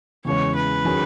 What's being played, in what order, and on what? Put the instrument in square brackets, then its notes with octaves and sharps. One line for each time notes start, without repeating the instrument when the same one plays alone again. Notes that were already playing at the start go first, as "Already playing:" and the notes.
[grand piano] E2 C#3 E3 G#3 C#4 [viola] C#5
[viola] B4
[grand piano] D#3 F#3 C#4 G#4